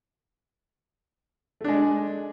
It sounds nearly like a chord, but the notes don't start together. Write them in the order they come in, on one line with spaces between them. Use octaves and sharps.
A3 D4 G#3